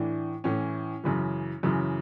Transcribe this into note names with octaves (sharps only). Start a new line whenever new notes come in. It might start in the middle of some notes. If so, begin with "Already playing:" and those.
Already playing: A2 E3 D4
A2 E3 C#4
F#2 C#3 E3
F#2 C#3 E3